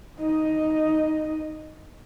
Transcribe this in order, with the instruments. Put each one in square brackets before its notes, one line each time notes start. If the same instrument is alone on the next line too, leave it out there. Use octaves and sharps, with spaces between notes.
[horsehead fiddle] D#4 D#5